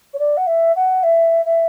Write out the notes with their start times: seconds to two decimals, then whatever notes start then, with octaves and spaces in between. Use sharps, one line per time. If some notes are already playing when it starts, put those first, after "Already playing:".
0.13 C#5
0.19 D5
0.37 F#5
0.47 E5
0.76 F#5
1.03 E5
1.45 E5